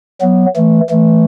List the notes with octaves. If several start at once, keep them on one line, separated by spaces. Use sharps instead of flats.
F#3 B3
E3 A3
E3 A3